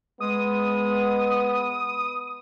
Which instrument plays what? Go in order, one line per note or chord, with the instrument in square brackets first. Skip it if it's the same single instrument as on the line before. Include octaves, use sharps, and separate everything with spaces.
[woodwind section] G#3 [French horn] B3 [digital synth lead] D#6